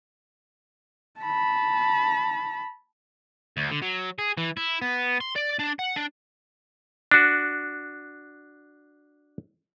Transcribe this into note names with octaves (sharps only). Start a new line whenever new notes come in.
A5 B5
D2
D3
F#3
G#4
E3
E4
B3
C6
D5
D4
F#5
D4
D4 F#4